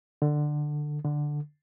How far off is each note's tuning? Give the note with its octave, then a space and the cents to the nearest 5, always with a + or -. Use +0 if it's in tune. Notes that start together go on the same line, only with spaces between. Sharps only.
D3 +15
D3 +5